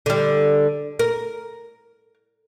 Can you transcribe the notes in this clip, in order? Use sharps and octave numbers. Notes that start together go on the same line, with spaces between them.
D3 G3
A#4